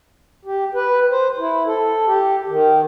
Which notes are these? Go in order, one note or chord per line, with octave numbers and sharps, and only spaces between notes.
G4
B4
C5
E4
A4
G4
D#3